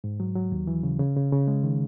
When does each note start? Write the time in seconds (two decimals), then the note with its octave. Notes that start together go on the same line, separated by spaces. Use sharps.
0.04 G#2
0.20 F#3
0.35 F#3
0.52 D#2
0.67 E3
0.83 C#3
1.00 C#3
1.16 C#3
1.32 C#3
1.47 G#3
1.64 D#3